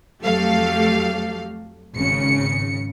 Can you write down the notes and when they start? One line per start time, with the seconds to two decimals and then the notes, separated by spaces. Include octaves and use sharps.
0.22 F2 F#3 A3 G4 A4 F5
1.94 G#1 C#3 C#7